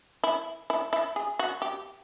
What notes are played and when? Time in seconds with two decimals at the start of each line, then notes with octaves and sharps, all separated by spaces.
0.24 E4
0.70 E4
0.93 E4
1.16 G#4
1.39 F#4
1.62 G4